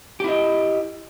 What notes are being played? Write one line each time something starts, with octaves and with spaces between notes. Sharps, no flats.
E4 G4 D#5